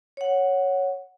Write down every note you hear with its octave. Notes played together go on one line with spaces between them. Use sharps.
C#5 F#5